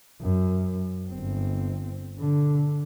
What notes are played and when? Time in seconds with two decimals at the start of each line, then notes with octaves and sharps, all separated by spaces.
0.21 F#2
1.10 G1 C4
2.19 D3